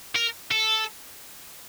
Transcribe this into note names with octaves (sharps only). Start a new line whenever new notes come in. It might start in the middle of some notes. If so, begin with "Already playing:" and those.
A#4
A4